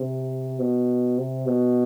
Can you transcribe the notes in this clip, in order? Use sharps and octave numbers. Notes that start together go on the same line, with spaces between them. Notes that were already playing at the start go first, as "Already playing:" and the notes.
Already playing: C3
B2
C3
B2